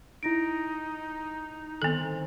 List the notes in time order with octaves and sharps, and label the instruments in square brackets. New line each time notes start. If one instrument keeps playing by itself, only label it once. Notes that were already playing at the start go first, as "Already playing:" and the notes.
[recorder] D#4 [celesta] E4 A#6 D7
[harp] D#3 C4 [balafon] B3 A4